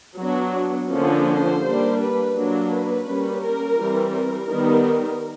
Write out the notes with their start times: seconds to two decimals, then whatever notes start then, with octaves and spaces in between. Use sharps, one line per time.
0.18 F#3 B3 D4 F#4
0.90 D3 F3 A#3 C#4
1.26 C5
1.62 G3 A#3 D4
1.98 B4
2.34 F#3 A#3 D4
2.69 B4
3.05 G3 A#3 C#4
3.41 A#4
3.77 E3 G3 C4
4.13 A#4
4.48 D#3 G3 B3